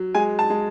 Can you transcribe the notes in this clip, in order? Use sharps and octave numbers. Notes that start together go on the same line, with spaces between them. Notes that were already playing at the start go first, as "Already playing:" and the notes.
Already playing: F#3
G#3 G#5
A5
G#3